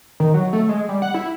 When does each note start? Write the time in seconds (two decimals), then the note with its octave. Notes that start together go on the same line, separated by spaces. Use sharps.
0.20 D#3
0.34 F#3
0.53 A3
0.69 G#3
0.89 G3
1.02 F#5
1.14 E4